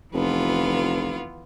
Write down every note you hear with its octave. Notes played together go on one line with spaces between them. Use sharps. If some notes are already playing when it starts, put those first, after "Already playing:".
F1 E3 B3 F4